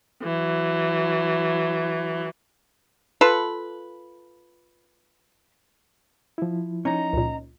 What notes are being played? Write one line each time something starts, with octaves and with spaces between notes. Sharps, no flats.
E3 F#3
F4 A4 B4
F3 E4
C#4 D#4 A#5
C#2 A#2